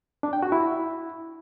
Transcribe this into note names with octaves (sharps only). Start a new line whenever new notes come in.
D4
G5
F#4
E4